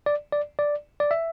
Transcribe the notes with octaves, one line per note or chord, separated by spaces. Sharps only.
D5
D5
D5
D5
E5